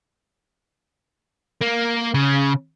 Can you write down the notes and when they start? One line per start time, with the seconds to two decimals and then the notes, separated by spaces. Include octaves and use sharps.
1.62 A#3
2.14 C#3